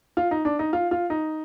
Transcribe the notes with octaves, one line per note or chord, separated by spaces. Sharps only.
F4
D#4
D4
D#4
F4
F4
D#4